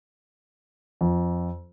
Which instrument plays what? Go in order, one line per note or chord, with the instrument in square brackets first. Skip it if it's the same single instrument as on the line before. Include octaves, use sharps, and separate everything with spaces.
[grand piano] F2